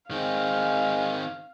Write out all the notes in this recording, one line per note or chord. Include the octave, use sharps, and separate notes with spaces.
D#3 G#3 C4 F5